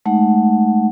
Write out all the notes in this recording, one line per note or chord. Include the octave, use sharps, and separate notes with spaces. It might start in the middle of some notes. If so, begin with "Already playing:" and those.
G#3 A3 D#4 F#5